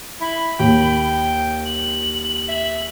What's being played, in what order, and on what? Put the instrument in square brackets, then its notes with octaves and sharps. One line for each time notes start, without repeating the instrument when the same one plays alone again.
[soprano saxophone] E4 [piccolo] B5
[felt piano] D#2 [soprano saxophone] G5
[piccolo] F#7
[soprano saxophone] E5